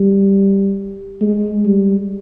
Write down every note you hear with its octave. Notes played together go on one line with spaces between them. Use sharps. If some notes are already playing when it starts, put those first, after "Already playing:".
Already playing: G3
G#3
G3